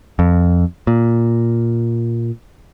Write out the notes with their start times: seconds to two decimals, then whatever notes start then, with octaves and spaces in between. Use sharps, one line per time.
0.19 F2
0.87 A#2